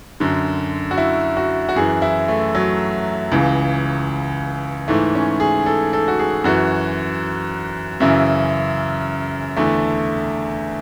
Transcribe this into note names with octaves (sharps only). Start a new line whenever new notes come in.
F#2 D3
F#4
E4
F#4
F#4
F#2 E3 G#4
E4
A3
F#3
C#2 C#3 E3
G#2 E3 A3
C#4
G#4
A4
A4
F#4
G#4
F#2 E3 F#4
F#2 C#3 E3 E4
E2 D3 A3